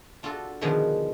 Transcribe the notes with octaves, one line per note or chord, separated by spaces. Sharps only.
D4 F4 F#4 A4
B2 D3 D#3 F3 G#3